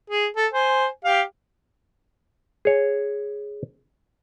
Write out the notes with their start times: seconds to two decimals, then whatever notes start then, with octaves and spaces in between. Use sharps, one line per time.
0.10 G#4
0.36 A4
0.53 C5 G#5
1.05 G4 F5
2.65 G#4 C#5